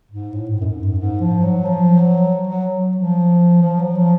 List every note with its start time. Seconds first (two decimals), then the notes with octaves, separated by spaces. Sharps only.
0.11 G#2
0.33 A2
0.50 G#2
0.61 F#2
0.66 G#2
0.83 F#2
0.99 G#2
1.20 F3
1.43 F#3
1.65 F3
1.98 F#3
2.48 F#3
2.96 F3
3.62 F3
3.79 F#3
3.95 F3